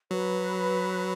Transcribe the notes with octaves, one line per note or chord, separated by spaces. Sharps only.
F#3 B4